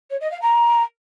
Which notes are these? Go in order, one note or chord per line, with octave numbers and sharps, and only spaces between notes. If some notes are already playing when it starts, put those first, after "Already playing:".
C#5
D#5
F5
A#5